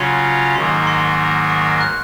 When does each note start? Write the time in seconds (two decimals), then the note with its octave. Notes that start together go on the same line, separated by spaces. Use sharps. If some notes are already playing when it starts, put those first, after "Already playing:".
Already playing: C#3 F#3 C#4 F4 C6
0.55 G#2 D#3 F#3 A#3 C6
0.87 C6
1.50 C#6
1.65 F6
1.81 F#6